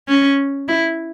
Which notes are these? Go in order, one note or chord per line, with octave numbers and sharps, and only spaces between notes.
C#4
E4